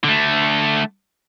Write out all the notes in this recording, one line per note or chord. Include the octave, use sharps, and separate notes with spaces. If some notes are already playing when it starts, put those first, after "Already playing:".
D3 A3